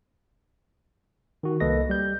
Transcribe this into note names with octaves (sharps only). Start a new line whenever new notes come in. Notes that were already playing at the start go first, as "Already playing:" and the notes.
D#3 F#4
C2 A#3 A4 B4 D#5 A#6
G3 G6